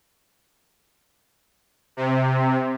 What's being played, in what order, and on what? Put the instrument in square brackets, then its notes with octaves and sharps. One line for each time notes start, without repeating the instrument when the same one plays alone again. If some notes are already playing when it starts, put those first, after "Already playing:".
[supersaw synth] C3